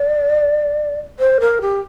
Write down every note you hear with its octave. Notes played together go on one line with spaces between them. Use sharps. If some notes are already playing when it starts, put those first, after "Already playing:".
Already playing: D5
C5
A#4
G4